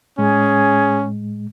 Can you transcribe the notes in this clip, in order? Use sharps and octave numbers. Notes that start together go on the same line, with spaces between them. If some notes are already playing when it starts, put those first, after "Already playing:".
A2 G#3 C#4 G#4